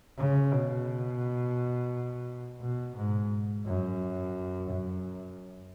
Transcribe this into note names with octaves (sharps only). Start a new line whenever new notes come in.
C#3
B2
B2
G#2
F#2
F#2